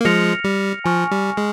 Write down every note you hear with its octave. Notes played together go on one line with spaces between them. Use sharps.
A#3
F3 G#3 F6 A#6 C#7 F7
G3
F3 G#5 C#6 F6
G3
G#3